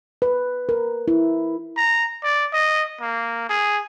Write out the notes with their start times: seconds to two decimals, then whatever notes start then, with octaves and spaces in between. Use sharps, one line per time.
0.22 B4
0.69 A#4
1.08 E4
1.77 A#5
2.23 D5
2.53 D#5
3.01 A#3
3.49 G#4